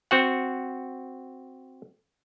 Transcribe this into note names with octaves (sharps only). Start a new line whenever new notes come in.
C4 F#4 F#5